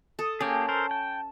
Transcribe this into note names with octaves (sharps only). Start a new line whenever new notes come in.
A4 D#6
A#3 C#4 G4 G#4 A5
A4 A#4 C5
G5